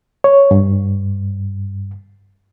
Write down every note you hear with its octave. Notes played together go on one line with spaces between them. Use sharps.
C#5
G2